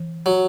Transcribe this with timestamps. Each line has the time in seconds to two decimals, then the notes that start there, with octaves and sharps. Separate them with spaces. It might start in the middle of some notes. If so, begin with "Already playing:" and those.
Already playing: E3
0.26 F#3